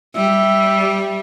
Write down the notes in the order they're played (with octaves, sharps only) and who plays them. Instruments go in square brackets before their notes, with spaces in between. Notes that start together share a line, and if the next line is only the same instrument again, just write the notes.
[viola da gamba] G3 [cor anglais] E5